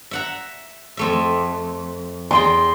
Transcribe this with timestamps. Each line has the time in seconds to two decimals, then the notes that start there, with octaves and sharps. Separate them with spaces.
0.11 E5 F#5 A#5
0.97 F2 A3 E5
2.31 E2 D#5 G5 C6